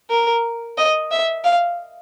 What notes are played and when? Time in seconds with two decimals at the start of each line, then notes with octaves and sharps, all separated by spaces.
0.10 A#4
0.78 D#5
1.11 E5
1.44 F5